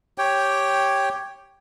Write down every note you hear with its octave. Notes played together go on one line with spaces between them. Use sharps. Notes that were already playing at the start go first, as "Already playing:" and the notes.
G4 C#5 G5